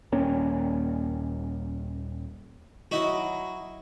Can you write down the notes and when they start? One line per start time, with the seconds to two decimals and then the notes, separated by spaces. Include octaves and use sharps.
0.12 D#1 A#3 C#4
2.91 F#3 E4 F#4 D#5 B5